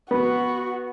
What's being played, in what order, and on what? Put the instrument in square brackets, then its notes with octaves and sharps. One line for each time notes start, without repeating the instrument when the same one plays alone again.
[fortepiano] B3 [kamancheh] F#4